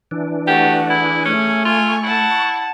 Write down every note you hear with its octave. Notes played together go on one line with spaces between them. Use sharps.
E3 D4
A3 F#4 G4 F#5
E4 G#4
A3 C#4
F4 G#5 C#6
E4 F#5 A5